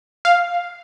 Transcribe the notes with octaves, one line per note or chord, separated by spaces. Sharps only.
F5